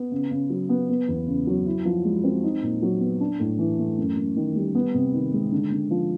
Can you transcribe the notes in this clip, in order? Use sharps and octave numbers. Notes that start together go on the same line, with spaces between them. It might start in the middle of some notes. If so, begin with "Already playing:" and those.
Already playing: B3
C#3
C#3
F#3
B3
B3
E2
C#3
F#3
E4
F3
G#3
C4
D#4
A#2
F#3
B3
D4
A2
E3
A3
F#2
F#2
D#3
G3
B3
C3
D#3
G#3
D3
D3
F3